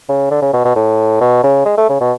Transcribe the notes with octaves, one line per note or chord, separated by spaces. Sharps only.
C#3
D3
C#3
B2
B2
A2
B2
C#3
G#3
A3
C#3
B2